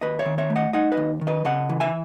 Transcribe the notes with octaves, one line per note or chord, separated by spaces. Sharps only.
D#2 B4 D#5
C#5 E5
D#3
C#5 E5
A3
D#5 F#5
D#4 D#5 F#5
B4 D#5
D#2
D#3
B4 D#5
C#3 D#5 F#5
E3
E5 G#5